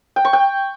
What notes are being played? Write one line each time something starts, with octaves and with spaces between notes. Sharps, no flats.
G5
C#6
G5